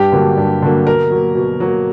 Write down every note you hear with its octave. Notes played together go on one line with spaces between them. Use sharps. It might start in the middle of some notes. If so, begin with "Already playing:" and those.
Already playing: G2 G4
D3 F#3 A#3
G2
D3 F#3 A#3
B2 A#4
F#3 A#3
B2
F#3 A#3